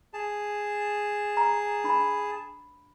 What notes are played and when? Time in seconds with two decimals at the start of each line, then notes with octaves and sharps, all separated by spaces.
0.14 G#4 A5
1.37 A#5
1.84 D4 B5